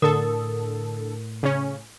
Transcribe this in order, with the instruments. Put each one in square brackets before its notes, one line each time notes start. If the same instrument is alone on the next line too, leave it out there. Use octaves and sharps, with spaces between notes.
[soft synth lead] A2 [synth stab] D3 A4 [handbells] A#4 D#6
[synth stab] C#3 C#4